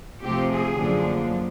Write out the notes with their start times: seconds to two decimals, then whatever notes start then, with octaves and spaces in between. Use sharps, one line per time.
0.22 C3 F3 A3 C4 G4
0.50 G#4
0.78 F#2 D3 F3 A#3 D4